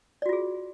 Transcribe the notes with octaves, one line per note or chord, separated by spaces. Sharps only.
F4 F#4 G#4 D5